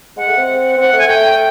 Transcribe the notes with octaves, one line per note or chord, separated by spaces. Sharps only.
G#3 F#5
A3
C4
C4 F#5
A3
G#5
A3 G5